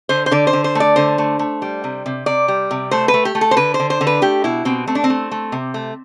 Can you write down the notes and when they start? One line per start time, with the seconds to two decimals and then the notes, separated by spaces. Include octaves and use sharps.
0.09 D3 C5
0.26 C5
0.31 D3 D5
0.47 C5
0.53 D3
0.64 C5
0.75 A3 D5
0.96 D3 C5
1.18 A3
1.39 A3
1.62 G3
1.84 C3
2.06 C3
2.26 C3 D5
2.48 G3
2.71 C3
2.91 A3 C5
3.08 B4
3.14 A3
3.25 G4
3.35 A3
3.41 A4
3.51 C5
3.57 D3 B4
3.74 C5
3.80 D3
3.90 C5
4.01 D3
4.07 B4
4.22 A3 G4
4.44 B2 E4
4.65 B2 C4
4.87 A3 C4
4.95 D4
5.04 C4
5.10 A3
5.31 A3
5.52 C3
5.74 A3